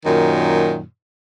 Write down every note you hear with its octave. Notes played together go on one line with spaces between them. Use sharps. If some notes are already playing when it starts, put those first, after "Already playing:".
F#2 A#2 D#3